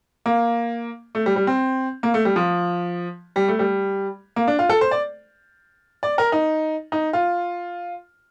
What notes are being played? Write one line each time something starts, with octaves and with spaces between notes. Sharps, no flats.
A#3
A3
G3
G3
C4
A#3
A3
G3
F3
G3
A3
G3
A#3
D4
F4
A4
C5
D5
D5
A#4
D#4
D#4
F4